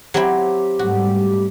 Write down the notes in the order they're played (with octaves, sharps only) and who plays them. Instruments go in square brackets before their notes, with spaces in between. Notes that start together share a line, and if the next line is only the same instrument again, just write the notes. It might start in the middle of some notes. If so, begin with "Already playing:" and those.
[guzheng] F#3 C4 E4 [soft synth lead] G4
[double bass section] G#2 G3 A3 [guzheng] F#4